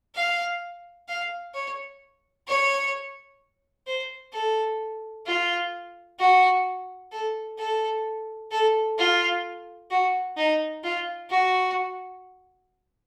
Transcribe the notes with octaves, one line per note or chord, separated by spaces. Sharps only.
F5
F5
C#5
C#5
C5
A4
F4
F#4
A4
A4
A4
F4
F#4
D#4
F4
F#4